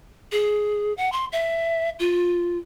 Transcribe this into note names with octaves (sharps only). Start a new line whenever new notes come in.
G#4
F#5
C6
E5
F4